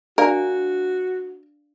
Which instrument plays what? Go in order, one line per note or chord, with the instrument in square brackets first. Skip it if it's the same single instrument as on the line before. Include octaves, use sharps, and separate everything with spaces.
[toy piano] D4 D5 F5 [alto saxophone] F#4 [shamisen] A#4